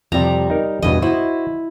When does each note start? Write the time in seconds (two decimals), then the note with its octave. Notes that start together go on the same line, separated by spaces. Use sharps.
0.12 F2 C3 G3 A#5
0.50 D#4 A#4
0.82 E2 G2 B2 D#5 G#5
1.02 E4 F#4 C5